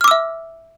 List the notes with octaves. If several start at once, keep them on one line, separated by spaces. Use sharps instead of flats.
E5 D6 E6 F6